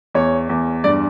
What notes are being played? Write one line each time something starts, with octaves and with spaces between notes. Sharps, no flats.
E2 C#5
E2
G2 D5